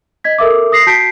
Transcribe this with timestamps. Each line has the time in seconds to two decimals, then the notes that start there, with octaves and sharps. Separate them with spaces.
0.24 D#5 G#6 B6
0.38 A4 A#4 E5 D6
0.72 D#6 A#6 C7
0.87 F#4 A5 G6 B6 C7 D7